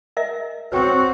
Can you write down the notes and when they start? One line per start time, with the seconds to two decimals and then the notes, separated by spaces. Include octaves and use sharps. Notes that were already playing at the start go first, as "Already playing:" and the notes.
0.17 A#4 D#5 E5
0.72 C4 F#4 B4 C#5 G5